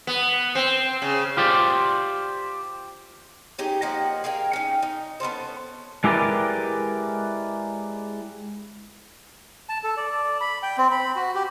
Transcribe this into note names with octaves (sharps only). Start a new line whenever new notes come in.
B3
C4
C#3
F4 G4 C5 D5
C#4 D#4 G4 G#4
F3 A#3 D#5 F#5
G#4 A#4 F5 G5
C#4 D#4
D#4
B3 C#4 A4 C5
G#3 E4 G4 A#4 B4 D5
A5
A4
D5
B5
G5
C4
B5
F#4
G4